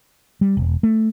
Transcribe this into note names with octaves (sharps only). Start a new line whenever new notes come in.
G3
E1
A3